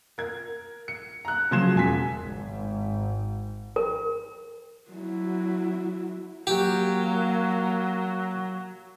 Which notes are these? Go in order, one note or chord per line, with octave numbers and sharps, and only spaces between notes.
A#4 G#6
C#7
A#5 F#6
C#3 F3 F#3 C6 G#6 E7
E1 G#5 B6
G#1 G#2
A#4
F#3 E4
F#3 A#3 G4